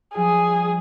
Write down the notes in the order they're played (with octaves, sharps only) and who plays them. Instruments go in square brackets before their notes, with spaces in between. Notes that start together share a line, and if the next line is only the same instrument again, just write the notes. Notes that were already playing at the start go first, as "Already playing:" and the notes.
[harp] F3 G3 [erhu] G#4